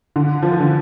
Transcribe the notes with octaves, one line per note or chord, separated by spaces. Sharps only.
D3
F3
E3
D3